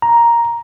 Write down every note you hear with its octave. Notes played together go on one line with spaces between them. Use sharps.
A#5